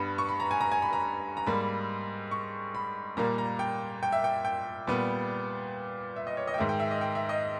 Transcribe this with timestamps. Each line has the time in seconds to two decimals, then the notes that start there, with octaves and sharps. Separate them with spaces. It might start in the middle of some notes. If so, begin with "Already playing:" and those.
Already playing: G2 G3 B3 B5
0.18 C#6
0.29 B5
0.40 A#5
0.51 G#5
0.61 A#5
0.72 G#5
0.82 B5
0.93 A#5
1.37 A#5
1.46 G#2 G3 A#3 B5
2.31 C#6
2.75 B5
3.17 A#2 G3 A#3 A#5
3.38 A#5
3.59 G5
4.03 G5
4.12 E5
4.24 G5
4.45 G5
4.87 A#2 G3 B3
6.16 E5
6.27 D#5
6.37 C#5
6.48 D#5
6.54 G5
6.58 G#2 D#3 G#3 E5
6.69 G5
6.80 E5
6.91 D#5
7.01 G5
7.15 E5
7.29 D#5